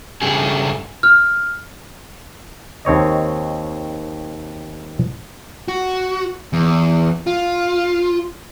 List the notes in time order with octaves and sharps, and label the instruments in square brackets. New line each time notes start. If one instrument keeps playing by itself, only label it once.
[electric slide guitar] G2 C#3 A3 G4 G#4
[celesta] F6
[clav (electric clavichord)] D#2 C4 C#5 D#5
[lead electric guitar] F#4
E2
F4